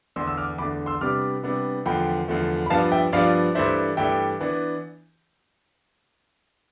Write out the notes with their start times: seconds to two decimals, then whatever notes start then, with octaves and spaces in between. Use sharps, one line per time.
0.16 E2 D3 A3 D4 C6 E6
0.27 E6
0.37 D6 F6
0.58 E2 D3 A3 D4 B5 D6
0.86 C6 E6
1.01 C3 G3 B3 D4 D6 F6
1.43 C3 G3 B3 D4
1.86 E2 D3 F3 A3 G5 B5
2.28 E2 D3 F3 A3
2.66 B5
2.70 G2 F3 B3 D4 F5 A5
2.92 E5 G5
3.12 G2 F3 B3 D4 D5 F5
3.55 G2 E3 A3 D4 C5 E5
3.97 G2 E3 A3 D4 E5 G5
4.40 E3 B3 D4